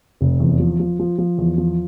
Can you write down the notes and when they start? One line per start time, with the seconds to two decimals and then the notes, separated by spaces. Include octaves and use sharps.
0.21 F1
0.40 E2
0.60 F3
0.80 F3
0.99 F3
1.18 F3
1.38 E2
1.58 F3